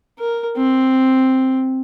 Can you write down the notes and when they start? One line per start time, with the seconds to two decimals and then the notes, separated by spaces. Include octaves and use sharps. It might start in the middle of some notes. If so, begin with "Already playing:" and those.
0.19 A#4
0.57 C4